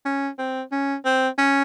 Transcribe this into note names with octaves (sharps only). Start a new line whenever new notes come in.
C#4
C4
C#4
C4
C#4